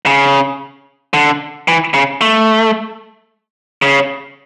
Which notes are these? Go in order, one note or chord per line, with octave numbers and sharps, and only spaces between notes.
C#3
D3
E3
C#3
A3
C#3